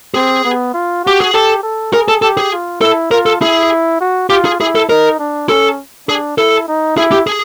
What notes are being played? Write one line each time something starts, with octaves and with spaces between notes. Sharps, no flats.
C4 G#4
B3
F4
F#4 G4
G#4
G4 A4
A4
G#4 A#4
A4
G4 A4
G#4
F4
E4 A4
F4 A#4
A4
E4 G#4
F#4
F4 G4
G#4
E4 G#4
A4
D#4 A#4
D4
C#4 A4
D4 G#4
E4 A4
D#4
E4 G#4
G4
G#4